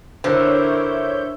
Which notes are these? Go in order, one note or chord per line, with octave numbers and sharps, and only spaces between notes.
D3 E4 A#4 C5 C#5 E5 E6 G6